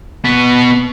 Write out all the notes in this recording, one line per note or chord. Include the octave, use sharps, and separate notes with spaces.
B2 B3